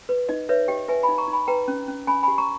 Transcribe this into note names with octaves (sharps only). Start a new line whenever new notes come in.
B4
D#4 D#5
B4 C#5 E5
G4 D#5 G5
B4 E5 G#5
G#5 B5
D#4
A#5 C#6
D#4
G#5 B5
B4 G5 A#5
C#4
C#4
C#4 G#5 B5
G4 G#5 B5
A#5 C#6